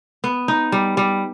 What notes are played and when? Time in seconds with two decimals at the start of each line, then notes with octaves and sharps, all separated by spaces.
0.24 B3
0.48 D#4
0.72 G3
0.97 G3